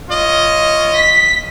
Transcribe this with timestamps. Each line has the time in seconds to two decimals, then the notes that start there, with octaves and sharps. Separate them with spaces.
0.10 F4 C#5 D#5
0.96 B6